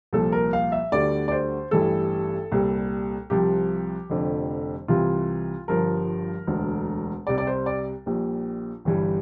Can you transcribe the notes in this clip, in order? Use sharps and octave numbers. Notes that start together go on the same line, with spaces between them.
C2 A#2 F3 A4
A#4
F5
E5
D2 D3 G3 D5
D5
C5
A1 G2 E3 G3 A4
C2 A#2 G3
C2 C3 F3 G4
F1 F2 D3
C2 C3 E3 F4
G1 G2 F3 A#4
E1 D2 D3
C2 C3 G3 D5
D5
C5
D5
A#1 A#2 G3
G1 G2 E3 G3